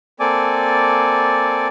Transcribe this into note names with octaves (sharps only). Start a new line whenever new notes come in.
A#3 C4 A4 D5 G#5 D6